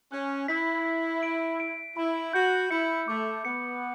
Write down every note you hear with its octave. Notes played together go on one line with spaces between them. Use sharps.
C#4 F#6
E4 B6
B6
D7
D7
E4 B5
F#4 G6
E4 C#7
A3 D6
B3 C#7